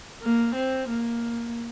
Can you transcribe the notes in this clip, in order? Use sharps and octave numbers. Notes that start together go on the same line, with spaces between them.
A#3
C4
A#3